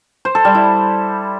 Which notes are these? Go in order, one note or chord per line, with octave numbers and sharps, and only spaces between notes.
C5
A4
G3
E4